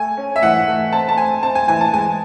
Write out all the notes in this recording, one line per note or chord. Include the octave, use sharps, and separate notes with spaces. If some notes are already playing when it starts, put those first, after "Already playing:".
Already playing: A3 G#5
C#4
E5
E3 F#5
A3
C4 A5
A5
C4 G#5
C4 A5
G#5
E3 G#5
A5
G#3 G#5